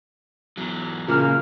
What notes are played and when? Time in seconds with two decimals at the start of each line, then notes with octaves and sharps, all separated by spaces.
0.57 E2 F#3
1.08 A#2 C#3 A#3 F4 F6